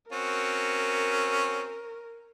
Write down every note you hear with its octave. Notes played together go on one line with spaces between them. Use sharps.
C4 C#4 F#4 A#4